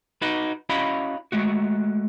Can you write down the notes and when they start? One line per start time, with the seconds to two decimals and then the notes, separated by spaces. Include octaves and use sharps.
0.22 D#4 F#4 B4
0.69 C#4 E4 F#4 D#5 F5 B5
1.32 G#3 A3 F#4